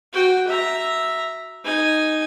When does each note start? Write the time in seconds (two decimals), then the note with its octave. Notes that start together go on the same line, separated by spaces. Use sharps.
0.13 F#4 G5
0.47 E5 A#5
1.64 D#4 G#5